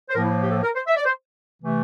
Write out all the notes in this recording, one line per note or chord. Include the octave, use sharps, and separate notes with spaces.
C5
A2 F3 A#3 A#4
E4
G4
A4
A#4
C5
E5
D5
C5
C3 E3 A3